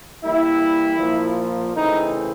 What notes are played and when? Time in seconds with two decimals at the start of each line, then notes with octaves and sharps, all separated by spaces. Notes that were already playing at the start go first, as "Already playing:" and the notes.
0.23 E3 G3 A#3 E4
0.99 A#2 F3 A#3
1.75 C#3 E3 A3 C4 D#4